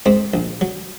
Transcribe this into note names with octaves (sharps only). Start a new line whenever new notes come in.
G#2 C4
A#1
F#3